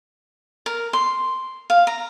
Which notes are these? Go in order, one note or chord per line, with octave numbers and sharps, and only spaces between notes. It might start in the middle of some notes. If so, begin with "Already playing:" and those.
A#4
C6
F5
A#5